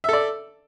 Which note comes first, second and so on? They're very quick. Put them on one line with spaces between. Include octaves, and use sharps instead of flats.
E5 A4 D5